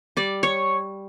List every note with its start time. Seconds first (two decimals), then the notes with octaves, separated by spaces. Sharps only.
0.17 G3 D5
0.43 C#5